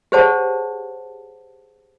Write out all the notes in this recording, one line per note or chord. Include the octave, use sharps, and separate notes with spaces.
G4 G#4 C5 C#5 F#5 A5